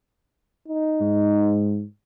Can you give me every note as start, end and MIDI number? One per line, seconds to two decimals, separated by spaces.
0.68 1.69 63
1.01 1.83 44